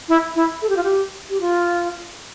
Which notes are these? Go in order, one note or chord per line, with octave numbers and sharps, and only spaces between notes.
E4
E4
A4
G4
F4
G4
G4
F4